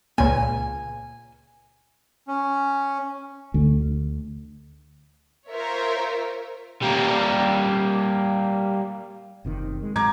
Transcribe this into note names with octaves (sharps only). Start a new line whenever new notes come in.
C#2 A#2 G#5
C#4
D2 D3
F4 A#4 C5 C#5 E5
G3 A#3
F#1 C3 D#3
G#3
G#2 F#3 A#5 D6 G#6